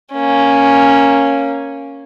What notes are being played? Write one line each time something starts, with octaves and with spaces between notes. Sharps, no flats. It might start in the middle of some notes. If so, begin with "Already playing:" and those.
A#3 C#4